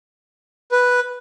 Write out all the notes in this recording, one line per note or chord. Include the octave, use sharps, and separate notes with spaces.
B4